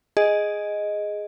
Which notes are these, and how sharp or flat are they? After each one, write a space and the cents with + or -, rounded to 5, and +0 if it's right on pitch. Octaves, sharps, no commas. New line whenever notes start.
G#4 +0 D#5 +0